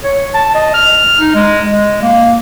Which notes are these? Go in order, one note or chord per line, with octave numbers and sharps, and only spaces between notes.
C#5
A5
D#5
F6
D#4
G#3
G#3
A#3